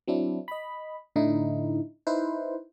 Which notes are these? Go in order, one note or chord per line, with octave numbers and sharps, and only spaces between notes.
F#3 C4 D4 E4
D#5 B5
A2 D3 D#4 E4
D#4 E4 B4 C5